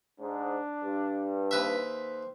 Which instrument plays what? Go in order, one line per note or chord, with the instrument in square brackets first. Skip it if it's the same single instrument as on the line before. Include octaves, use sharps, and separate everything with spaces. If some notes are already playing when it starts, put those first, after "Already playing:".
[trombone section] G#2 [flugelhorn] D4
[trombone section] G2
[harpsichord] D#2 B4 E5 [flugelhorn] C5